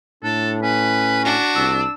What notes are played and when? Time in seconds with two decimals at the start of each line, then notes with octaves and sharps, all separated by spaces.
0.23 A2 D4 A4
0.63 C#4 B4
1.24 D4 F#4
1.56 C2 E6